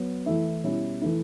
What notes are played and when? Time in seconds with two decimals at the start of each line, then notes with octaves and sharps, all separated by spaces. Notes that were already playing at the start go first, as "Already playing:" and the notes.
Already playing: F#3 B3
0.26 E3 A3 E4
0.64 B2 G3 C#4 E4
1.01 E3 A3 E4